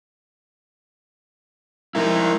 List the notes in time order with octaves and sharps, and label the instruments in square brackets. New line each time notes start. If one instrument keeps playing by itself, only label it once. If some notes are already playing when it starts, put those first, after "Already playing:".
[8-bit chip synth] F3 G#3 D#4 [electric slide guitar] E4 A#4